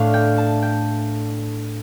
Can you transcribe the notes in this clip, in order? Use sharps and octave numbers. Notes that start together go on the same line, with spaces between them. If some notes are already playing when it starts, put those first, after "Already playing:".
Already playing: A2 A3 D4 F5
G5
A5
G5